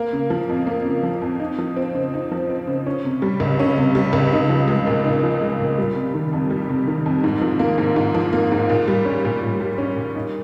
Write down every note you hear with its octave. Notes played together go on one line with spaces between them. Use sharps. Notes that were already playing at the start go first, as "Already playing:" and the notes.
Already playing: A#3
C#3
F3
F2
A#3
C#3
F3
F2
D#4
F3
C4
C#3
D#4
F3
C4
C#3
C#4
C3
G3
C#2
C#4
C3
G3
C#2
D#4
F3
G#3
A#2
D#4
F3
G#3
A#2
G3
C3
D#3
F2
G3
C3
D#3
F2
G#2
F3
A#3
G#2
G#2
F3
A#3
G#2
A#2
G3
C#4
A#2
A#2
G3
C#4
A#2
D#4